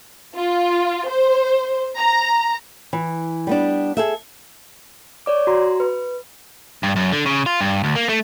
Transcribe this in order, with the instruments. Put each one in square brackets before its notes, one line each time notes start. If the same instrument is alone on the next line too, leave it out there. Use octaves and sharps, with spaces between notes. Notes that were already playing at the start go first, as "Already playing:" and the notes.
[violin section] F4
C5
A#5
[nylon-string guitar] E3
G3 B3 D4
G#4 A4 E5
[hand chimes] C#5 D5 D6
F#4 A#5 C6
B4
[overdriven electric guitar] G2
F#2
D3
C#3
F4
G2
D2
A#3
A3